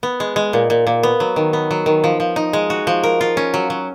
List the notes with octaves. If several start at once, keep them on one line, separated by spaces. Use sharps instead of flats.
B3
G#3
G#3
A#2
A#2
A#2
B3
F#3
D#3
B3
F#3
D#3
F3
F3
D#4
G#3
F#4
F3
A#4
F4
C#4
F#3
F#3